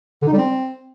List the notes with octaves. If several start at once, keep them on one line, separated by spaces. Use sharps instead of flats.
D3
D#4
G3
C4